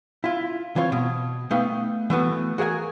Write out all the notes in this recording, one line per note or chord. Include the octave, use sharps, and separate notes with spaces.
E4 F4
E3 C4 F4 C#5
B2
A3 B3 D#4 B4 F5 G5
E3 A3 B3 F#4
F#4 G#4 A#4 E5 G#5